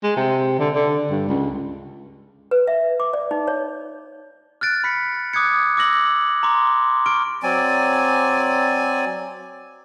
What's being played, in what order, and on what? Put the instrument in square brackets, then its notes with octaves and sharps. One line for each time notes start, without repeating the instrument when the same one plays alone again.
[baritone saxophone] G#3
C3
D3
D3
G2
C#2
[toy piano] B4
E5
D6
D5
D#4
C#5
[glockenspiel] F6 F#6 A6 D7
B5 B6 C#7
D6 D#6 F#6 G#6 C#7
D6 E6 A#6 F#7
A#5 C6 D6
C#6 F6 D7
[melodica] F#3 C4 D5 G#5